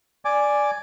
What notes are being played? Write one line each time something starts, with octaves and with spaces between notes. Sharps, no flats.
D5 G#5 D6